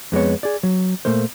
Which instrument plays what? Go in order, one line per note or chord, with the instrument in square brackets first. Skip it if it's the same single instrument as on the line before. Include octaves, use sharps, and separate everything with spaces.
[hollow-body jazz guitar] F2 G#3 B3 C#5
G#4 D5
F#3
A#2 A3 A#3 C5